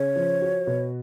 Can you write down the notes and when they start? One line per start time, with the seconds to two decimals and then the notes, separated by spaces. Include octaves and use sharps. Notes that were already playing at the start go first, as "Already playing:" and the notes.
Already playing: C#3 C#5
0.16 F3
0.42 F#4
0.67 B2